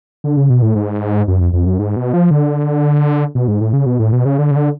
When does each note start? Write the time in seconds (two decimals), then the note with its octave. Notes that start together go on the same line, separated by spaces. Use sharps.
0.24 D3
0.37 C#3
0.50 B2
0.62 A2
0.76 G#2
1.28 F#2
1.41 F2
1.53 F2
1.66 F#2
1.79 G#2
1.96 B2
2.13 F3
2.31 D3
3.35 B2
3.48 G#2
3.61 A2
3.73 C#3
3.86 B2
3.99 A2
4.12 B2
4.25 C#3
4.39 D3
4.51 C#3
4.56 D3